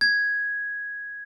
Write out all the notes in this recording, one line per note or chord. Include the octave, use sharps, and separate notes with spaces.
G#6